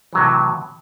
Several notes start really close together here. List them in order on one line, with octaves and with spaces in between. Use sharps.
E3 F#3 C3 A2